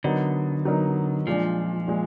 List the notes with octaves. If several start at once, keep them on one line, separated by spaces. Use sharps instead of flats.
D3 F#3 B3 D#4 A#4
F#3 B3 D#4 A#4
A#2 F3 G#3 D4
A#2 G#3